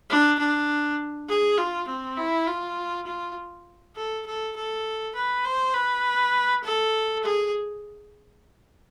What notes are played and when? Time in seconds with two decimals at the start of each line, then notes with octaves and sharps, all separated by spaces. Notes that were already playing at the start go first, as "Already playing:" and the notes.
0.10 D4
0.39 D4
1.29 G#4
1.58 F4
1.88 C4
2.17 E4
2.47 F4
3.07 F4
3.96 A4
4.26 A4
4.56 A4
5.16 B4
5.45 C5
5.74 B4
6.64 A4
7.23 G#4